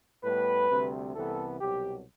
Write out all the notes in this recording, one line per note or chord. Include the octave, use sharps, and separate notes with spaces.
A2 G3 B3 B4
D2 C3 G3 C4
C2 C3 E3 B3 A4
C2 B2 F#3 G4